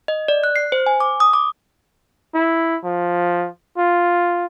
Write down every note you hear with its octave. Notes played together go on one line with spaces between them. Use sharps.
D#5
D5
F#6
C7
C5
G#5
D6
D#6
D6
E4
F3
F4